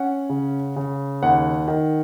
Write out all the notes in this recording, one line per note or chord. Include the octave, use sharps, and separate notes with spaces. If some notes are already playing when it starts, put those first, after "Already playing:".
Already playing: C#4 F#5
C#3
C#3
D#2 F#5
D#3